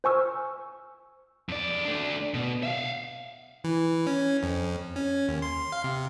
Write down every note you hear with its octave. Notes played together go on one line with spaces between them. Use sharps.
C5 G#5 C#6 E6 F6
F2 D5
A3 D4
B2
E5 F5
E3
C#4
F2
C#4
D#2
C6
F5
C3